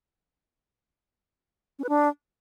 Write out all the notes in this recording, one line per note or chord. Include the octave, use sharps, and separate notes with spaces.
C#4
B4
D4